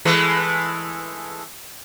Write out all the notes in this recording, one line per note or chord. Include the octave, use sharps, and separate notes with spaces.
E3 G#3 A3